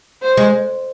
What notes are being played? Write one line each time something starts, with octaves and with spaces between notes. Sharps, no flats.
C5
G#3